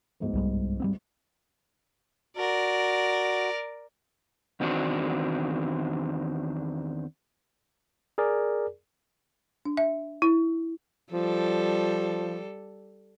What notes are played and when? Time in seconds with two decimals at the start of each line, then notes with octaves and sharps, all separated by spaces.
0.20 G1 D2 G#2
0.34 C2 G3 G#3
0.80 G3 B3 C4
2.37 F#4 A#4 D5
4.60 E2 D#3 C4 D4 F#4
8.18 G#4 A#4 D5
9.65 D4
9.77 E5
10.22 E4
11.12 F3 G3 A4